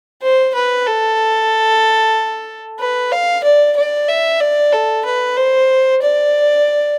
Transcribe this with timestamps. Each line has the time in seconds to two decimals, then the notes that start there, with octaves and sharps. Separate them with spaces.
0.22 C5
0.54 B4
0.86 A4
2.79 B4
3.12 F5
3.44 D5
3.76 D5
4.08 E5
4.41 D5
4.73 A4
5.05 B4
5.37 C5
6.02 D5